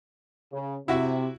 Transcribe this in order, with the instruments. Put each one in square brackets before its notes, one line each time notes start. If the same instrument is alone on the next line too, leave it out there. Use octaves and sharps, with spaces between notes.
[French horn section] C#3
[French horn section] C3 [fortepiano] E4 F#4 E5